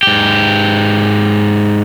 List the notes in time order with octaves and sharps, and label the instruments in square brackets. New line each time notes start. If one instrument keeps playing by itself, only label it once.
[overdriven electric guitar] G#2 G4